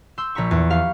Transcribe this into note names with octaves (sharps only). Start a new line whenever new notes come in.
C6 E6 G6
A#1 A#5 B5 C#6
E2
G4 F5 C#6